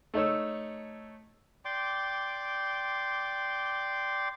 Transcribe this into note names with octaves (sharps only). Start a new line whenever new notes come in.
A3 D#4 C#5 E6
D5 G5 C6 D6